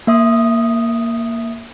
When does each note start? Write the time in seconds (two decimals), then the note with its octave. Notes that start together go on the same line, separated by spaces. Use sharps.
0.07 A#3 E5 D#6